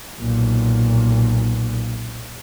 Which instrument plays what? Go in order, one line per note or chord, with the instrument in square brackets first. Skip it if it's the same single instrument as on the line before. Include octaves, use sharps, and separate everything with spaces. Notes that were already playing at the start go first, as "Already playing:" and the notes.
[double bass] B1 A#2